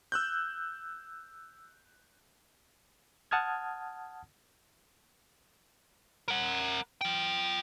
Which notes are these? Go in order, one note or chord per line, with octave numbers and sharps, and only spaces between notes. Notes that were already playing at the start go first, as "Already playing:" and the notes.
E6 F#6 G6
F#5 A5 D#6 F6 G#6
A#4 F#5
F4 G5